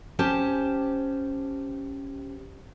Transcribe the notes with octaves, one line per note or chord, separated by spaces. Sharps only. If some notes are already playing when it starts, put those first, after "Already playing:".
C#4 G4 C5 A5